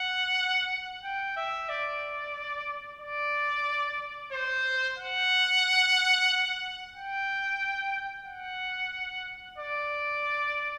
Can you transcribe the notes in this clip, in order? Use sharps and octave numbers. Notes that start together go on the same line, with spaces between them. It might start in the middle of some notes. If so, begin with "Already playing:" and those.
Already playing: F#5
G5
E5
D5
D5
C5
F#5
G5
F#5
D5